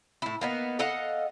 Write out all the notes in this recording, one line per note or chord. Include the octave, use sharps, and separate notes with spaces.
A2 E4
A#3 B3 D#4
A4 D#5 F5 F#5